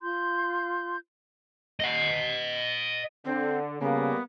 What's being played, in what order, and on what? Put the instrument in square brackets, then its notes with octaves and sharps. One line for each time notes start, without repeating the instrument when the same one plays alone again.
[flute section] F4 C6 G6
[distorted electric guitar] D#5 F#5
[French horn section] D3 [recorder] C4
[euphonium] C#3 [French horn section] G3 A#3 [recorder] B3